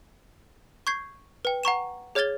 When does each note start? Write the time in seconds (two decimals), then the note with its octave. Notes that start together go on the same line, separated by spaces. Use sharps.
0.87 C#6 G6 G#6 C7
1.45 B4 G5
1.63 F#5 A#5 C#6 E7
2.15 G#4 C#5 F6 G#6 A6 G7